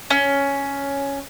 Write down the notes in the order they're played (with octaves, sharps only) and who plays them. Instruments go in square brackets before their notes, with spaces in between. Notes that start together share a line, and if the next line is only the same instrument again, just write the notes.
[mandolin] C#4